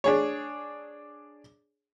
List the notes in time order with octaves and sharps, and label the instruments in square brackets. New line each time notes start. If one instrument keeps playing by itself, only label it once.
[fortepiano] D4 G#4 C#5